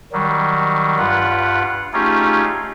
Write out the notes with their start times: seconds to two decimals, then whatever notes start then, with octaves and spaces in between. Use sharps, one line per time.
0.12 D#3 F#3 G3
0.98 G2 F4 B4 F#5
1.93 A3 C#4 D#4 F4 G4 G#4